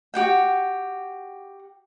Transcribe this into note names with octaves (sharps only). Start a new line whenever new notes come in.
F#4 G4 F#5 G5